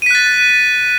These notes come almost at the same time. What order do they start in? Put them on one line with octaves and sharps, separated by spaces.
D#7 B6 F#6 A6